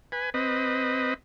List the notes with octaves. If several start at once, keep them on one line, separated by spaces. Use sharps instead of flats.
B4 G#5
C4 B4 D#5